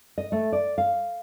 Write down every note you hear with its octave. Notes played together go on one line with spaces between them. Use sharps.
D#5
A3
D5
F5